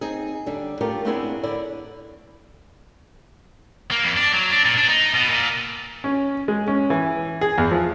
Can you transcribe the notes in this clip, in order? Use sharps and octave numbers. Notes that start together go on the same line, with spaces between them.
C4 D#4 G#4
D3 G3 D4
A3 F4 G4 A4 A#4
A3 B3 C4 D4 E4 G#4
D3 E4 D5
A#3
F2
D4
F#3
D4
A#2
D4
D#4
B2
A#2
C#4
G#3
C#4
E3
G#4
E2
F3